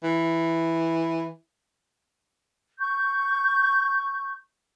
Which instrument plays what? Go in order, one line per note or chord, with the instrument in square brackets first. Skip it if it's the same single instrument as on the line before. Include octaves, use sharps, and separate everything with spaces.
[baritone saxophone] E3
[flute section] C#6 G6